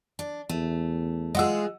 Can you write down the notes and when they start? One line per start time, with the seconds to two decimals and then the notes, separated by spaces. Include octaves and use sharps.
0.19 D4
0.49 E2 A3
1.35 G#3 F4 G#4 D#5 F#5 E6